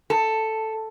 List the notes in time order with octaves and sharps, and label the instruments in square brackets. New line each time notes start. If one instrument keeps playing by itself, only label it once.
[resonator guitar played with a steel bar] A4